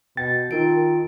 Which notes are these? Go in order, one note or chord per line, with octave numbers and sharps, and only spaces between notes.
B2 G5 A6
D#3 D#4 F4 A#4 D7